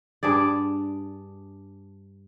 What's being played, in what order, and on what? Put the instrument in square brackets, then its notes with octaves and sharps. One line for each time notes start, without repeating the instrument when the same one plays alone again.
[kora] G2 D4 G#4 D5